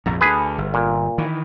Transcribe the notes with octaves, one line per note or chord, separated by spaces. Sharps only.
A#1 F2 G#2 A#5
D2 D3 G#4 B4
G1
A#2
D#3 E3